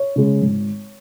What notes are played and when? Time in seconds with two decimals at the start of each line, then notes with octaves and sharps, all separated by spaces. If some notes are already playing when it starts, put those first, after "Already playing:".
Already playing: C#5
0.16 C#3 G#3
0.41 G#1